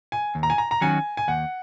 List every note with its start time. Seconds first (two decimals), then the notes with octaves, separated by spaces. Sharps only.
0.12 G#5
0.35 D#2
0.43 A#5
0.50 G#5
0.58 A#5
0.71 A#5
0.81 D#3 F#3 C#4 F#4 G#5
1.17 G#5
1.28 D#2 F#5